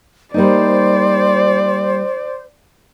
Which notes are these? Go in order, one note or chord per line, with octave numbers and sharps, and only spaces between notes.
G3 A#3 D#4 C5 D5